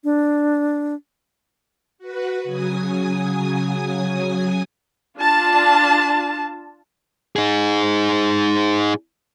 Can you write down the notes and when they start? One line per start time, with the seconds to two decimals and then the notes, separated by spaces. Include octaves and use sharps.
0.04 D4
1.98 F#4 B4
2.44 C#3 F#3 G#5 D#6
5.18 D4 F4 A5
7.36 D#4 G#4